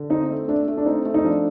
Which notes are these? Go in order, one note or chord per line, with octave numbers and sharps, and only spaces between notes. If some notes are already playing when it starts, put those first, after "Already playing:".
Already playing: D3
C4 D#4
A3
A3 D4
A3
D4
C4 D#4
A3
D#4
F3 D4